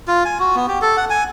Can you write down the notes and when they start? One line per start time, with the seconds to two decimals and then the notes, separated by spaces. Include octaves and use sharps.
0.08 F4
0.25 G#5
0.40 F#4
0.55 B3
0.68 G4
0.82 A4
0.97 F#5
1.10 G#5